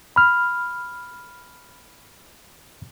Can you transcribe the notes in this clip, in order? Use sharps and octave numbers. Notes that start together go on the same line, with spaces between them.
B5 F6